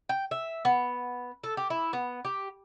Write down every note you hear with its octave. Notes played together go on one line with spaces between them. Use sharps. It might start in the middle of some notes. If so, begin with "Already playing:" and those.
G5
E5
B3
A4
G4
E4
B3
G4